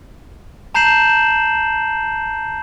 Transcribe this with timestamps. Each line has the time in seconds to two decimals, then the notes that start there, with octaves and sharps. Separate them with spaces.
0.74 A5 A#5 G6 C7 E7 F#7